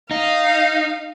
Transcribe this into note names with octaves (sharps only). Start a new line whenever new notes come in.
D#4 F5